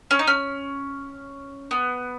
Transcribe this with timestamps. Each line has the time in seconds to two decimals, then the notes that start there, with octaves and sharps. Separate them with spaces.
0.11 C#4
0.19 D#4
0.27 C#4
1.71 B3